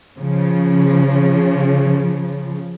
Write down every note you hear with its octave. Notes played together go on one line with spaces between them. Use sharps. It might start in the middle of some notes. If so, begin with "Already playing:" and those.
C#3 F3